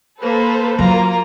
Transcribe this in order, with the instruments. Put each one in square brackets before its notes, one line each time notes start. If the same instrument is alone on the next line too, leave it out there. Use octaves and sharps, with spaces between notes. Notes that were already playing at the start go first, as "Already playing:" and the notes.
[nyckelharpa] A#3 [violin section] A4 B4 C5
[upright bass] F#3 [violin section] A#3 [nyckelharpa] F4 A#5